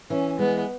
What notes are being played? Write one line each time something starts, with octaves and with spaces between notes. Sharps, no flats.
E3 C#4
G#3 B3